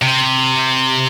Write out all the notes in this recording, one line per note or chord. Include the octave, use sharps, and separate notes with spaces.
C3